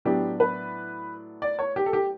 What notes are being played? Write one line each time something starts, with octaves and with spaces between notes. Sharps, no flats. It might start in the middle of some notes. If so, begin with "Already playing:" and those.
A2 F#3 B3 D4 G4
B4
D5
C#5
G4
A4
G4